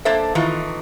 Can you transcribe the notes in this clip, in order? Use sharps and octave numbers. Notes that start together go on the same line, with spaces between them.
A#3 D4 A4 C5 E5
D#3 E3 A3 D#4 F4